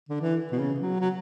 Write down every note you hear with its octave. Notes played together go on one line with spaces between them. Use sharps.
D3
E3
B2
C#3
F#3
F#3